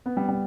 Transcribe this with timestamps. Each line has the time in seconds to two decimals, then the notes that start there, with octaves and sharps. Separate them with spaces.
0.06 B3
0.17 G3
0.29 G3